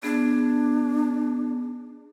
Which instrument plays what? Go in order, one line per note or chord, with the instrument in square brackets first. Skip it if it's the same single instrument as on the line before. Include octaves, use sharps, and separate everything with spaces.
[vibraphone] B3 G#4 [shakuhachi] D4